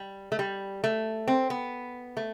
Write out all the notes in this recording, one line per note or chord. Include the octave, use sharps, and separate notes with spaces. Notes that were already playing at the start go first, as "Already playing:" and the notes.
Already playing: G3
A3
G3
A3
C4
B3
A3